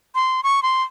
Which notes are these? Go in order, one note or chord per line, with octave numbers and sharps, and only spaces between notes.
C6
C#6
C6